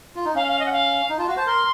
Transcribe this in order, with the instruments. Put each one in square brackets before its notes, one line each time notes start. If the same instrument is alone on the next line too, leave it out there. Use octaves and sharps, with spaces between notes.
[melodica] F4
D#4
[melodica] C#4 [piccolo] F5
[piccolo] F5
D#5
F#5
F5
[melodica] D#4
[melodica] F4 [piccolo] A5
[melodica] F#4 [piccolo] F5
[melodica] C5 [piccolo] A5
[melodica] A#4 [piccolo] C6